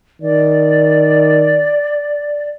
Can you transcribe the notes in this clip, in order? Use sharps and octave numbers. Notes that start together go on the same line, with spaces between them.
D#3 D5